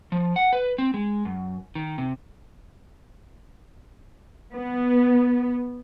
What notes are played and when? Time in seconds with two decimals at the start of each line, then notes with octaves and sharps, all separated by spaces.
0.12 F3
0.36 F#5
0.53 B4
0.78 C4
0.94 G#3
1.25 F#2
1.75 D#3
1.98 C3
4.54 B3